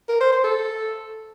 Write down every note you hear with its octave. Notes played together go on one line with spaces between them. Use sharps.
A#4
C5
C5
A4